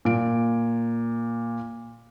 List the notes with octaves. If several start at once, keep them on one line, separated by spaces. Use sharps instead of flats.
A#2 D7